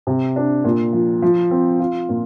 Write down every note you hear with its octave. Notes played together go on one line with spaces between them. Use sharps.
C3
D4
A#2
F3
F3
C4
F4
A#2